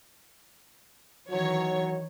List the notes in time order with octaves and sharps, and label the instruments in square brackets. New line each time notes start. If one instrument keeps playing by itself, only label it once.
[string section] D#3 E3 C#5 [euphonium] F#3